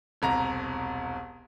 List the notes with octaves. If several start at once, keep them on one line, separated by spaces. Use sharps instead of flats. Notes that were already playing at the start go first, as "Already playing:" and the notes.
E1 C2 A#5